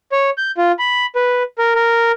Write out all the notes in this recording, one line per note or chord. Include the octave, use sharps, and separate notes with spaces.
C#5
G6
F4
B5
B4
A#4
A#4